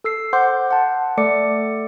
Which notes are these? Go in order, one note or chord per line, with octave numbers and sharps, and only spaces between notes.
A4 E6 C7
C5 F#5 C6 D6 G6
F#5 A5
A3 A4 D5 D6 C#7